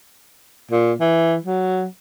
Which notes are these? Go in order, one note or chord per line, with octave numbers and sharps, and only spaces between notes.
A#2
E3
F#3